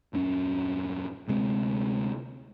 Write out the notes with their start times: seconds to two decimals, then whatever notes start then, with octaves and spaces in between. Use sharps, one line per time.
0.13 D#1 F#2 C4 C#4
1.28 D2 C3 G#3 C4